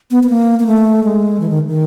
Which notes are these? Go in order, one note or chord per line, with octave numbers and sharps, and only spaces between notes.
B3
B3
A#3
A#3
A3
G#3
E3
D#3
D#3